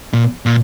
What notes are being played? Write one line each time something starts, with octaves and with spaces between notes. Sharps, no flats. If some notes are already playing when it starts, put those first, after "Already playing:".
A#2
A#2